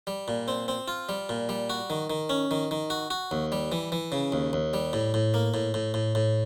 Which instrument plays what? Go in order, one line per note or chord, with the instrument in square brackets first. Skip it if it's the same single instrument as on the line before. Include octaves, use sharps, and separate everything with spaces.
[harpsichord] G3
A#2
C4
C4
F4
G3
A#2
G3
F#4
D#3
D#3
C#4
D#3
D#3
F#4
F#4
D#2
G3
E3
E3
C#3
D#2
D#2
G3
A2
A2
A#3
A2
A2
A2
A2